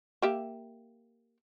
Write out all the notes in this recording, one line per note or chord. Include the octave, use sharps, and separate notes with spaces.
A#3 G4 E5